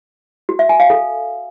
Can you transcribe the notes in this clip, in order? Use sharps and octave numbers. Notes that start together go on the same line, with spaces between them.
F#4
E5
G#5
F5
A4